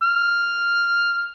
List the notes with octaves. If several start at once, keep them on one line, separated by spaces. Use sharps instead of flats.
F6